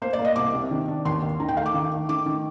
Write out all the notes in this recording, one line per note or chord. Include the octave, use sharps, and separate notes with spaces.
A#3 C5
D5
A#3
D#5
C2 D6
C3
D#3
D4
D#2 C6
D#2
D#3 A#5
G5
A3 F5
D6
D#3
A3
D#3 D6
D#3